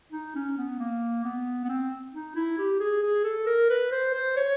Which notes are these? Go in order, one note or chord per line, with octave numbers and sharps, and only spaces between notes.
D#4
C#4
B3
A#3
B3
B3
C4
D#4
E4
G4
G#4
G#4
A4
A#4
B4
C5
C5
C#5